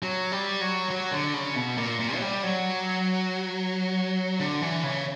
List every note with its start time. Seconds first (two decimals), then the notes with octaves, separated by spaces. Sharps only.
0.03 F#3
0.32 G3
0.61 F#3
0.90 F#3
1.12 D3
1.34 C#3
1.56 B2
1.78 A#2
2.00 A#2
2.16 F#3
2.21 G3
2.43 F#3
4.40 D3
4.62 E3
4.83 C#3